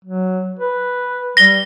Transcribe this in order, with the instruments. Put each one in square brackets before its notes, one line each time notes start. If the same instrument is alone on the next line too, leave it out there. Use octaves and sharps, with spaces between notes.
[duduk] F#3
B4
[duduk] G3 [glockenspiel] A#6 G7